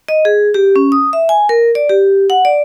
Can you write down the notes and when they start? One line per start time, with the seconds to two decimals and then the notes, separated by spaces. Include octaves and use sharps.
0.09 D#5
0.25 G#4
0.54 G4
0.76 C#4
0.92 D#6
1.13 E5
1.29 G#5
1.49 A#4
1.75 D5
1.90 G4
2.30 F#5
2.45 D5